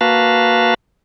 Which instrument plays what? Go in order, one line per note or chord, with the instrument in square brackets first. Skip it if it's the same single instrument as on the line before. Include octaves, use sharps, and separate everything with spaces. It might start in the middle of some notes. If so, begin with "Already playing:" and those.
[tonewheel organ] A#3 F#4 B4 F5 A5